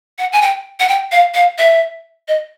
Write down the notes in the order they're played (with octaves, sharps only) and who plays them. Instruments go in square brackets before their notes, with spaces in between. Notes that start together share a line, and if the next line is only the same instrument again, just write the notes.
[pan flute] F#5
G#5
G5
F#5
G5
F5
F5
E5
D#5